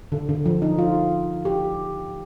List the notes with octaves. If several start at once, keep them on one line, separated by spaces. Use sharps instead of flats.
D3
D3
F3
D#4
F4
G4